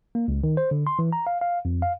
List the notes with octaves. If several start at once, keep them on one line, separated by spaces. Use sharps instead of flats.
A#3
C#2
D#3
C5
D3
C6
E3
A#5
F5
F5
F2
F5